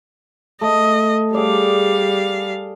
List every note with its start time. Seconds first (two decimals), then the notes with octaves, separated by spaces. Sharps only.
0.61 A3 D#5
1.34 G3 G#4 D5 F5